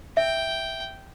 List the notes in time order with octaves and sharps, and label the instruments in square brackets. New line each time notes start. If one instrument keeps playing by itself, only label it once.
[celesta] E5 [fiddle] G5